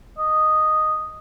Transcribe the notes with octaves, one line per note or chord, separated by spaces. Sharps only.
D#5